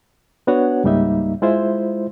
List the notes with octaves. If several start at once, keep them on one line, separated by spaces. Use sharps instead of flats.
B3 D4 F#4 B4 C#5 F#5
C#2 G#2 G3 A#3 D#4 E5
G#3 E4 F4 C5 E5